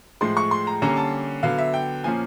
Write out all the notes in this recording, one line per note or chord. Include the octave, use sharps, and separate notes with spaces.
A2 F3 G#3 C6
C#6
C6
A#5
D3 G3 A#3 C#4 A#5
A5
D3 F#3 B3 F5
E5
G5
A#2 F3 A#3 C#4 G#5